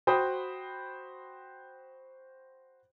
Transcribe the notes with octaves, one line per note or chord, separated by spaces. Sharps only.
F#4 C5 G5 B5 D#6